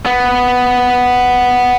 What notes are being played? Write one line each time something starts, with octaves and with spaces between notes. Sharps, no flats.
B3